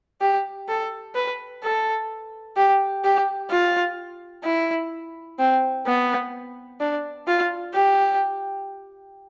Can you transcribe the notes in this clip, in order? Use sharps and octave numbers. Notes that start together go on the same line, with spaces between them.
G4
A4
B4
A4
G4
G4
F4
E4
C4
B3
D4
F4
G4